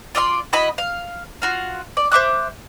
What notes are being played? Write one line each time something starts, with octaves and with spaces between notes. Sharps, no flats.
F4 D5 E5 C6
E4 F#4 D#5 B5
F5
F4 F#4 F5
D5
C5 E5 D6 F#6